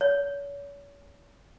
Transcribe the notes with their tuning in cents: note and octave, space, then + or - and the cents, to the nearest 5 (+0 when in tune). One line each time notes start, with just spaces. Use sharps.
C#5 +40